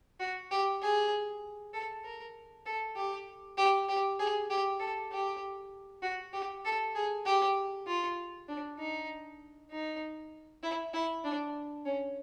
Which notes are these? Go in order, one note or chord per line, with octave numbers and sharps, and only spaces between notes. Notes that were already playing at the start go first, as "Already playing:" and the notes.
F#4
G4
G#4
A4
A#4
A4
G4
G4
G4
G#4
G4
A4
G4
F#4
G4
A4
G#4
G4
F4
D4
D#4
D#4
E4
E4
D4
C#4